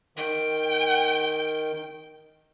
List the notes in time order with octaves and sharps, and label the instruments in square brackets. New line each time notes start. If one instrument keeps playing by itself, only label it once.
[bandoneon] D#3 [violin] G5